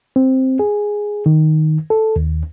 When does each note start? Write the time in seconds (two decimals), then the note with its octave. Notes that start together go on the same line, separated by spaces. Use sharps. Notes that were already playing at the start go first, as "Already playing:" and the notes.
0.16 C4
0.59 G#4
1.26 D#3
1.90 A4
2.16 D#2